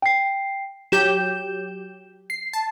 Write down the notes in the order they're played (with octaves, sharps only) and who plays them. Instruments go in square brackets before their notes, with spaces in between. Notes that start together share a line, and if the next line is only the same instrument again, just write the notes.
[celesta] G5 C7
[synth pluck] F#3 G4 G6 [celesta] E7
[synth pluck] C7
A5